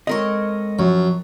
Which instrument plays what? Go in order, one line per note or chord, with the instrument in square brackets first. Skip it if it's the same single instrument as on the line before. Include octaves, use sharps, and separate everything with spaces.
[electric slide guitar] G#3 A4 D#5 [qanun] C4 A#4 C#5
[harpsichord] F#2 [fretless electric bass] F3 F#3